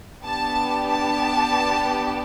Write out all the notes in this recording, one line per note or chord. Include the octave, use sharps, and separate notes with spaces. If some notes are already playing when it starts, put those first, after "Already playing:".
B3 D4 G4 A5
A5